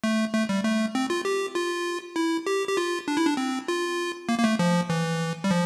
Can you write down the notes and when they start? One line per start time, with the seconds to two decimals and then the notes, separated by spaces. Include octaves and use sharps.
0.04 A3
0.33 A3
0.49 G3
0.64 A3
0.95 C4
1.10 F4
1.25 G4
1.55 F4
2.16 E4
2.47 G4
2.68 G4
2.77 F4
3.08 D4
3.17 E4
3.26 D4
3.37 C4
3.68 F4
4.29 A#3
4.39 A#3
4.44 A3
4.59 F3
4.90 E3
5.44 G3
5.51 F3